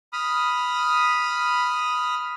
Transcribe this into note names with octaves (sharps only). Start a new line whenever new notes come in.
B5 D#6 F6